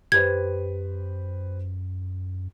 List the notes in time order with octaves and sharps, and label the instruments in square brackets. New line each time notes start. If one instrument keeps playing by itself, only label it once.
[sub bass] F#2 [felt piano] G4 B4 C5 [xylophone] G#6